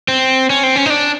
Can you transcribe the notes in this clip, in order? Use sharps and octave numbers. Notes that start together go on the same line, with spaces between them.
C4
C#4
C4
C#4
D#4
D4